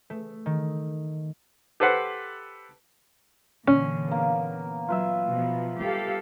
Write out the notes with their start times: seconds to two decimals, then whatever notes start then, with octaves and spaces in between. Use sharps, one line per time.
0.10 A3
0.46 D#3
1.80 G4 A4 B4 C5 F#5
3.67 A#2 D3 E3 C#4
4.08 A#3 B3
4.88 F#3 F4 B4 E5
5.27 B2 F3 B3
5.80 G3 G4 A4 F5